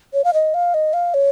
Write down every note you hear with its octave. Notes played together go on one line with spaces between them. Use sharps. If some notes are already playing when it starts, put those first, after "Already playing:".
C#5
F5
D#5
F5
D#5
F5
C#5